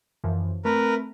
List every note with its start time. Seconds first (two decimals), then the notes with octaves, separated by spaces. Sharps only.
0.24 F#2 E3 F3
0.65 A3 C4 A#4 B4